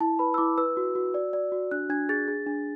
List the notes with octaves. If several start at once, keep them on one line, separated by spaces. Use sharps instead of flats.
E4 A5
B4 B5
E6
E4 D6
B4 E6
F#4
F#4
D5
D5
F#4
D4 F#6
D4 G#6
G#4 A6
G#4
D4